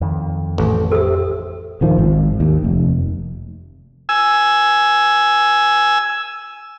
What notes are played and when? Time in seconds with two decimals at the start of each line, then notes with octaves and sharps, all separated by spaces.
0.01 F2 D#3
0.58 A1 A4
0.92 G4 A4 C5 E5 D#6
1.81 D#1 D#3 F3
1.99 G#1
2.40 D#2
2.64 F1
4.09 G#5 E6